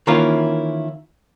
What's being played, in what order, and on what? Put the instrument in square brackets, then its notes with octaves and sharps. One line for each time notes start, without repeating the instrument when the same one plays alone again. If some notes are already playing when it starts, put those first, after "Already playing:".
[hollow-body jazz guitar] D#3 E3 A#3 C#4 E4 F4